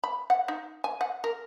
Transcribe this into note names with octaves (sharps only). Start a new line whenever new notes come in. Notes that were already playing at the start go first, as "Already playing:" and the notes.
B5
F#5
D#4
G#5
F#5
A#4